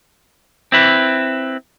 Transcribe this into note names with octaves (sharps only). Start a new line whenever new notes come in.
C4 E4 B4